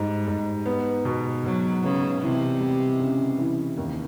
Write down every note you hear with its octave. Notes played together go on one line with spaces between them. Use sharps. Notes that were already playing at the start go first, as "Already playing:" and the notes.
Already playing: G#2 G3
G#2
B3
B2
B2 F#3
C#3 B3
C3 E3
G3
C#3
E3
D#2